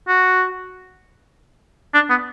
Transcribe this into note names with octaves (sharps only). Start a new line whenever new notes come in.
F#4
D4
B3